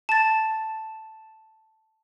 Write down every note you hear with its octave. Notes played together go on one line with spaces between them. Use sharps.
A5 A6